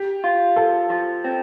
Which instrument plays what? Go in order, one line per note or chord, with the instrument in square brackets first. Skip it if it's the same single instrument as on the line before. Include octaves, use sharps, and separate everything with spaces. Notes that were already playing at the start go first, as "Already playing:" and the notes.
Already playing: [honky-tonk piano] G4
[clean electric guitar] F4
[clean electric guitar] F3 [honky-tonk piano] A4
[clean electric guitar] F3
C4